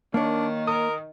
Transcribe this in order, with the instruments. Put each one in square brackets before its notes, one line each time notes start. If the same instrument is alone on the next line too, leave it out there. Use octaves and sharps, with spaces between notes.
[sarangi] D#3 [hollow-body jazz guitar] A#3 C#5 [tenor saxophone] D4
[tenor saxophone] A#4 [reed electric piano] D#6